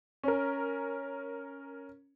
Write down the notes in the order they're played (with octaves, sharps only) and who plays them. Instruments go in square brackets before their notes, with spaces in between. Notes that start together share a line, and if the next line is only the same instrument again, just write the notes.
[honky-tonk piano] C#4 A#4